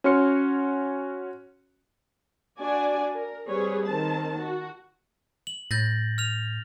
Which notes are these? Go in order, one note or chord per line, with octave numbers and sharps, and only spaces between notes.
C#4 F#4 C#5 C6 F6 C#7
D4 F#4 D5 G#5
A#4
G3 C4 G#4 B4 C#5
D#3 C4 A5
F#4
F#7
A2 G6 A6 A#6
F6 F7